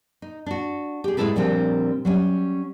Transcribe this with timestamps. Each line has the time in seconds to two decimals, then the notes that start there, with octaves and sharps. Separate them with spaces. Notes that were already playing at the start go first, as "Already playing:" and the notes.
0.22 D#4
0.46 D4 F#4
1.04 G4 G#4
1.17 A2 G#3 D4 E4 A4 B4
1.36 A#2 F3 G3 C4 D4
2.05 F#3 G3 C#4